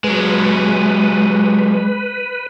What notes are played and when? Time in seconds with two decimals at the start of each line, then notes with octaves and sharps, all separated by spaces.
0.04 F#3 G#3 B4